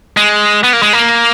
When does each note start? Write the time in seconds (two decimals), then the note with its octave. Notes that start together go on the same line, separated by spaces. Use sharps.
0.17 G#3
0.64 B3
0.73 A#3
0.82 G#3
0.93 A#3